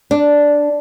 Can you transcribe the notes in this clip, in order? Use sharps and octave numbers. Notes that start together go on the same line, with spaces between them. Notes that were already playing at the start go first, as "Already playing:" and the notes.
D4